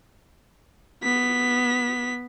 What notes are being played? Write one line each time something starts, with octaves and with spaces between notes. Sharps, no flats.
B3 B6